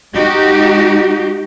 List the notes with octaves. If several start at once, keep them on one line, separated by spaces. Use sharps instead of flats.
G#3 D#4 F#4 G4